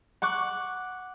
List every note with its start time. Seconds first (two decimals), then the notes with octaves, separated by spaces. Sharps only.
0.22 F#5 C#6 D6 F#6